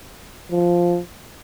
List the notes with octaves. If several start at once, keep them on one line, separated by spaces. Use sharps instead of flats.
F3